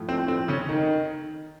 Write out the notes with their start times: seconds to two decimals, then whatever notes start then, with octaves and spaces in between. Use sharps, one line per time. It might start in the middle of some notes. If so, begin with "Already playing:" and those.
Already playing: A2 F3 A3
0.09 C4
0.28 C4
0.48 C#3 C#4
0.68 D#3 D#4